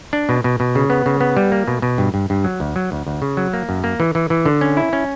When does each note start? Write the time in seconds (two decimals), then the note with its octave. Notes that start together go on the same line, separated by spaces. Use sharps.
0.13 D4
0.29 B2
0.44 B2
0.60 B2
0.75 C#3
0.90 B3
1.06 C#3
1.21 B3
1.37 G3
1.52 A#3
1.68 B2
1.82 B2
1.98 G2
2.14 G2
2.30 G2
2.44 F#3
2.60 D2
2.76 F#3
2.92 D2
3.07 D2
3.22 C#3
3.37 F#3
3.53 A#3
3.69 F#2
3.84 A#3
4.00 E3
4.15 E3
4.30 E3
4.46 D3
4.61 C#4
4.77 E4
4.93 C#4